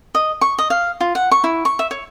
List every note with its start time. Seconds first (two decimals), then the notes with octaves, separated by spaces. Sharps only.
0.15 D#5
0.41 C#6
0.58 D#5
0.70 F5
1.00 F4
1.15 F#5
1.31 C#6
1.44 E4
1.65 C#6
1.79 E5
1.91 C#5